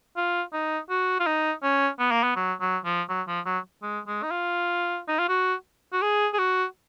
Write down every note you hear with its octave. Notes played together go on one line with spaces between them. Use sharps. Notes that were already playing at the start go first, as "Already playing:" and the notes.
F4
D#4
F#4
F4
D#4
C#4
B3
A#3
B3
F#3
F#3
F3
F#3
F3
F#3
G#3
G#3
D#4
F4
D#4
F4
F#4
F#4
G#4
G#4
F#4